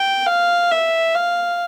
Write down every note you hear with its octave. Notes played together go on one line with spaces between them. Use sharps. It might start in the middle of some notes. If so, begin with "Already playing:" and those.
Already playing: G5
F5
E5
F5